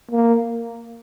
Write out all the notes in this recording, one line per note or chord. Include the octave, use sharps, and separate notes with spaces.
A#3